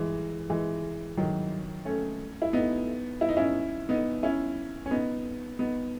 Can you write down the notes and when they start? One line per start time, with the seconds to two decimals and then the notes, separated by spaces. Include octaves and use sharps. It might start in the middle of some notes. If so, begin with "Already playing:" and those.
Already playing: E3 G#3
0.50 E3 G#3
1.17 D#3 F#3
1.85 A3 C#4
2.42 E4
2.53 B3 D#4
3.21 E4
3.29 D#4
3.37 C#4 E4
3.89 B3 D#4
4.23 C#4 E4
4.86 C#4
4.91 B3 D#4
5.59 B3 D#4